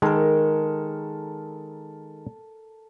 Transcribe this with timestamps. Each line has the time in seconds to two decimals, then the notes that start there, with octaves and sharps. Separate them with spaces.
0.02 D#3 G#3 A4 A#4